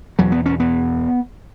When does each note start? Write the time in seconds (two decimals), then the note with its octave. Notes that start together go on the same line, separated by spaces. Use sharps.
0.19 E2 B2 F#3
0.32 B3
0.46 C#4
0.60 B3